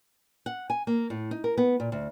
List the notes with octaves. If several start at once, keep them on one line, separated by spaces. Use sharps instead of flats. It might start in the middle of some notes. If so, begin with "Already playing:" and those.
F#5
G#5
A#3
A2
D#4
A#4
B3
A#2
D2